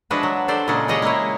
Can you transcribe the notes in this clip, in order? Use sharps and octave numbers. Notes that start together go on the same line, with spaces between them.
F3 G#3 D4 F#4 B4 E5
F#3
D4 G4 A4 C5 D5
A#2 C#3 G#3 C#4 A4 F#5
G4 G#4 C#5 D#5 F#5 G5
G#3 A#3 E4 C#5